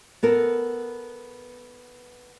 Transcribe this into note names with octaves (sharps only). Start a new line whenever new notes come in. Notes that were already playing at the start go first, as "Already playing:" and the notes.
B3 A4 A#4